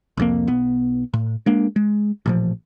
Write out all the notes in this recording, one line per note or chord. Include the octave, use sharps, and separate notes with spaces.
C2 F2 A#3
B1 B3
A2
G#3 A#3 D4
G#3
A1 A#2 F3